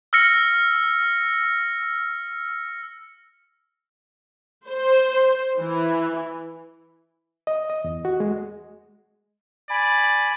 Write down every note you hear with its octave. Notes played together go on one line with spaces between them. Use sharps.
E6 F6 A#6 C#7
C5
E3
D#5
D#5
E2
F#4
G#3
D5 G#5 B5